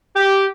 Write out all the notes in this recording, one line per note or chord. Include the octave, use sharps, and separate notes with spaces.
G4